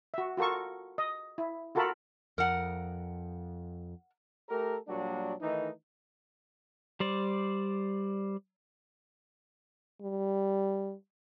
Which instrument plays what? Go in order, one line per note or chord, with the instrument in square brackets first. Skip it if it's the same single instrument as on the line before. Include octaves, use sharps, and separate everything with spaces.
[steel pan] F#4 E5
F4 F#4 A4 A#4 C#6
D#5
E4
F4 F#4 A4 A#4 A5 B5
[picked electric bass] F2 [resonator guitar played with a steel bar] A#4 F#5
[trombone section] A3 G4 A4 A#4
A#2 F#3 G3 A#3 D4 F#4
D#3 E3 A3 D#4
[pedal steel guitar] G3 C5 D5
[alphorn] G3